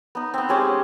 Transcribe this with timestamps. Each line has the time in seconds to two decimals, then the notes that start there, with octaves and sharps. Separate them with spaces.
0.15 B3 D#4
0.34 B3 C4
0.49 G#3 C#4 G4 C5